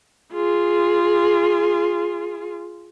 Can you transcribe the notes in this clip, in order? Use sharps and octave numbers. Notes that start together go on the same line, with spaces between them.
F4 G#4